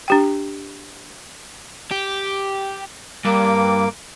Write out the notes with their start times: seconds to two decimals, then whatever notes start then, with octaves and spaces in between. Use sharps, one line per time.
0.08 D4 G4 G5
1.91 G4
3.25 G2 A#3 D6